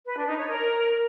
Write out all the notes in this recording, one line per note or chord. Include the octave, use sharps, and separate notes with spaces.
B4
D4
D#4
C#5
A#4